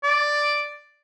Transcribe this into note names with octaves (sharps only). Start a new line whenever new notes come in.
D5